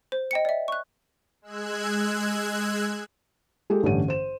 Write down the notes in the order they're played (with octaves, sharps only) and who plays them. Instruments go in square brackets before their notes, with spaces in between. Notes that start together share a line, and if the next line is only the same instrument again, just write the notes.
[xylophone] C5
D#5 G5 C#7
D5 E5
C#6 F#6
[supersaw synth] G#3 E6 F#6 G#6
[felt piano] G#3 G4 A4
A1 G2 D3 C#4 G4 D#7
C5 E7